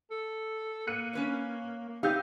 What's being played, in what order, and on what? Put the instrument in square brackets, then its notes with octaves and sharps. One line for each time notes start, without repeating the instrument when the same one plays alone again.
[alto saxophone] A4
[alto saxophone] A#3 [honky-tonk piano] F#6 C#7 D#7
[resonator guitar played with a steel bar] C#4 B4 C#5
[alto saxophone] A#3
[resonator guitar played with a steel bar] B3 D#4 F5 [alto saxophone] C4 [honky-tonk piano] G4 E6 G6